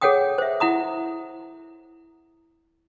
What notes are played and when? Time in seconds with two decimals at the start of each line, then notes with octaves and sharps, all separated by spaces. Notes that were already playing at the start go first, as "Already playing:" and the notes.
0.01 G#4 A4 C#5 F#5 G5 D#6
0.38 C5 E5
0.60 E4 F#5 A#5 D#6